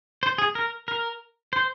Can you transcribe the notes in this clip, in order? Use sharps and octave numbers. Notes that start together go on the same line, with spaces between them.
C5
G#4
A#4
A#4
C5